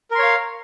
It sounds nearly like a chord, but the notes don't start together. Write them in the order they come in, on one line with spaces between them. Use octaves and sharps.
A#4 C6 C#5 F5